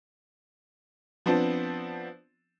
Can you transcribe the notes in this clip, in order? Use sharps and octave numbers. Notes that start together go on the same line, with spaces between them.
F3 B3 C4 D4